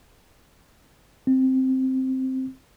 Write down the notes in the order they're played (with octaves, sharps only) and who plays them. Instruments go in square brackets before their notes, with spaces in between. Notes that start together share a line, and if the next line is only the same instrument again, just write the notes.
[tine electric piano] C4